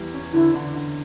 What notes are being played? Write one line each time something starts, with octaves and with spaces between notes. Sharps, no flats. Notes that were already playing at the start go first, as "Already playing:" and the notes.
Already playing: E2 G3
C#4
D3 E4
D3
D3